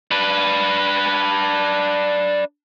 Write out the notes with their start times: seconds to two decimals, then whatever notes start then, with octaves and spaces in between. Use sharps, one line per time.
0.11 D4 B4